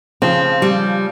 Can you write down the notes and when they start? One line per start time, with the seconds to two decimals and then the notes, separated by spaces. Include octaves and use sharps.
0.22 C#3 F3 C4
0.62 G3